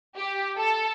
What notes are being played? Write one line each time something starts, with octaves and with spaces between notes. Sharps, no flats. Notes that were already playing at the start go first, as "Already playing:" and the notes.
G4
A4